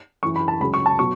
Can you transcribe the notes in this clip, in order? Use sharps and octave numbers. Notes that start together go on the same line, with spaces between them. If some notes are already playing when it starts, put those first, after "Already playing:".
F#2 E3 C#6
B5
A5
C#2 C#3 F#3 B5
C#6
A5
B2 F#3 C#6